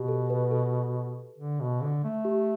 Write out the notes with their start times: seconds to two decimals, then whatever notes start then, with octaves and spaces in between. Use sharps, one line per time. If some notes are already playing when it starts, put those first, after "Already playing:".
Already playing: B2 G4
0.08 A4
0.30 B4
0.51 A4
1.38 D3
1.60 B2
1.82 D3
2.04 A3
2.25 G4